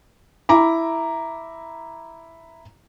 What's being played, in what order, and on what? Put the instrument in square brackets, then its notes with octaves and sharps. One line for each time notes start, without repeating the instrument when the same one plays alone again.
[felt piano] E4 A#5 D6